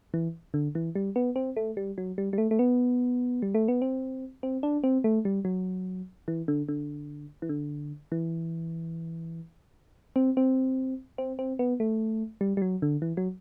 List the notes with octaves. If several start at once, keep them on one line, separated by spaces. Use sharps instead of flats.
E3
D3
E3
G3
B3
C4
A3
G3
F#3
G3
G3
A3
A3
B3
G3
A3
B3
C4
C4
D4
C4
A3
G3
F#3
E3
D3
D3
E3
D3
E3
C4
C4
C4
C4
B3
A3
G3
G3
F#3
D3
E3
F#3